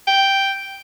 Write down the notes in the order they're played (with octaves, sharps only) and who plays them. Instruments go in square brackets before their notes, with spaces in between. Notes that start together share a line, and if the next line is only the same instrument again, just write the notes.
[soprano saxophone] G5